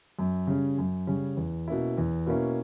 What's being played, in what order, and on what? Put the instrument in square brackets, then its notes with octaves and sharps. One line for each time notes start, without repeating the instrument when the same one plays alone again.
[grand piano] F#2
C#3 G3 C#4
F#2
C#3 G3 C#4
E2
B2 A#3 C#4 E4
E2
B2 A#3 C#4 E4